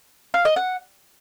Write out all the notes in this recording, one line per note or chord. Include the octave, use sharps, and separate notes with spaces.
F5
D#5
F#5